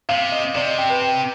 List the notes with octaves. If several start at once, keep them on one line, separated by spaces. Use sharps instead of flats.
C3 F5
D#5
C3 D5
D#5
G5
B4
G5